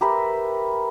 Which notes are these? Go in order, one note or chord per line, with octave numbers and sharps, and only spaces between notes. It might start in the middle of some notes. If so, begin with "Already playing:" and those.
G4 A#4 B4 E5